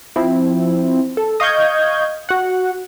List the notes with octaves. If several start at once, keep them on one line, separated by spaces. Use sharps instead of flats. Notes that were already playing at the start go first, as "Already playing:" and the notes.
F3 C4 E4
A4
D#5 F5 C#6 G6 G#6
F#4 F#5